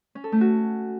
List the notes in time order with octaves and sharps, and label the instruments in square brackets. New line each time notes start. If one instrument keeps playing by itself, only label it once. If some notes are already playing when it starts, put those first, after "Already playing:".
[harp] C#4
A4
A3
F#4